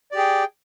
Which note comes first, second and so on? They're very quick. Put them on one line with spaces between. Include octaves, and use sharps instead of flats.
D5 G4 G#4 G5